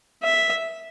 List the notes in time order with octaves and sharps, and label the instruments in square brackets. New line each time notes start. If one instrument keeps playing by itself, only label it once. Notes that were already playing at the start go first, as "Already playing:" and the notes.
[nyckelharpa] E5